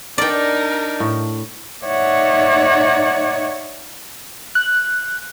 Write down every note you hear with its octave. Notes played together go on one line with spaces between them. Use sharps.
D4 D#4 A#4 D5 G5
A2
D#4 C#5 D5 E5 F#5
F#6